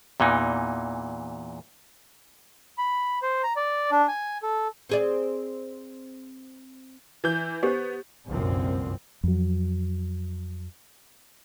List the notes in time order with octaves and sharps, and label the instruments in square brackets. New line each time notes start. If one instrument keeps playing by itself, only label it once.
[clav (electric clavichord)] E2 A#2 E3 D#4
[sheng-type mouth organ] B5
C5
A#5
D5
D4
G#5
A4
[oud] C4 G#4 D5
[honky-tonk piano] E3 G6
[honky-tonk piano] B3 [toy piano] G4 C5
[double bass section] G1 C2 F#2 A#2 F3 C4
[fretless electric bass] F2 F#3